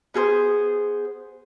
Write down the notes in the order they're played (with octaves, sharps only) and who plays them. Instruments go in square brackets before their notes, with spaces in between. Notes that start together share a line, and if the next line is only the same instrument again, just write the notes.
[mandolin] B3 G#4 A4 C5